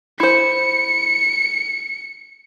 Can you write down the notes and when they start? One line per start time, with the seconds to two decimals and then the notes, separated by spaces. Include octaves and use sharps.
0.20 E4 C5 C#7